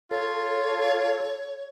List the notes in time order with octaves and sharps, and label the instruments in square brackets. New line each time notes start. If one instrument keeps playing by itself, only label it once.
[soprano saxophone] F4 [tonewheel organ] A4 [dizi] C#5